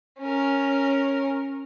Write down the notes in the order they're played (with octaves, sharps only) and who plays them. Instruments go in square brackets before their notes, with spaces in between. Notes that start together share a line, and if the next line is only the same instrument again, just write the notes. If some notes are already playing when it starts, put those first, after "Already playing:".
[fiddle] C#4 A#4